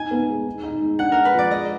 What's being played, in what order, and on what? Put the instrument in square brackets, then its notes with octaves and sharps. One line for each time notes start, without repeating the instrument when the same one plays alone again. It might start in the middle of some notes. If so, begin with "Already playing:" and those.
Already playing: [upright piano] D#4 [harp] G#5
[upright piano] B3
G#3
D#4
D#4
G#3
[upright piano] D4 [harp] F#5
[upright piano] G#3 [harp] A#4
[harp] B4
[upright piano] F3 [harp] D5
[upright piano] G#3 [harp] D#5